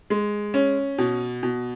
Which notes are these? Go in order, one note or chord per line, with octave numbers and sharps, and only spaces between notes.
G#3
C#4
B2
B2